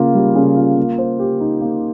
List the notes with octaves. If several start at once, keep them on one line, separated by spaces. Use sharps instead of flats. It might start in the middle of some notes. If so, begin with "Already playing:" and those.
Already playing: C#3 A#3 F4
G3
C#3
F4
A#3
C5
G4
D#4
A#3